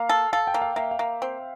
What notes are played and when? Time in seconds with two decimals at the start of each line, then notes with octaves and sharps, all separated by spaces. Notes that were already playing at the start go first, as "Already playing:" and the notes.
Already playing: A#3 F5
0.09 A4
0.33 A4 F5
0.47 G5
0.54 A#3
0.62 F5
0.76 A#3 E5
0.91 F5
0.99 A#3
1.22 C4